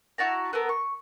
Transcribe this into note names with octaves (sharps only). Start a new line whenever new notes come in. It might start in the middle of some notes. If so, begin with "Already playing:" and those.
E4 F#4 A5 A#5
B3 A4 A#4
C#6